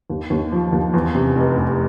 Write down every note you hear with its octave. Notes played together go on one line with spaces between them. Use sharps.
D#2
D#2
F3
D#2
E2
C3
F1
F1